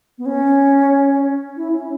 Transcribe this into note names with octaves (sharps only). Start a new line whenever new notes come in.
B3
C#4
E4
C#4